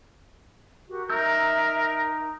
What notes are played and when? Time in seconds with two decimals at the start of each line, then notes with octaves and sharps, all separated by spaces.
0.89 F#4 G4 A#4
1.10 D#4 A#4 E5 E6 G6